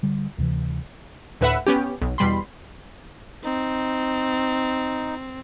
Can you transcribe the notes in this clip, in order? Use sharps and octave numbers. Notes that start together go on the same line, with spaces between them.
D3 G3
D2 C3 E3
D2 A2 B4 E5 F#5 B5
B3 C#4 G4
B1
E2 B2 G3 B5 C6
C4 D#4